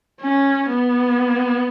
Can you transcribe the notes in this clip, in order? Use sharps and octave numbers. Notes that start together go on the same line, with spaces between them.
C#4
B3